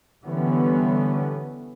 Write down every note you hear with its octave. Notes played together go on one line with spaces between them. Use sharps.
D3 E3 G3 B3 C#4